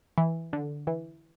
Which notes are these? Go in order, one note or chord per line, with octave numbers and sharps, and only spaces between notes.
E3
D3
E3